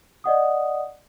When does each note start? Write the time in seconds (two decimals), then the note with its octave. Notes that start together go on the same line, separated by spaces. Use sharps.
0.24 D5 D#5 F#5 D#6